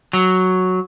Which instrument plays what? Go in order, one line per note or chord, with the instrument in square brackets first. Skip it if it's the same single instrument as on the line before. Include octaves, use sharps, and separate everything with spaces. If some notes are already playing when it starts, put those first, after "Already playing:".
[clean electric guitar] F#3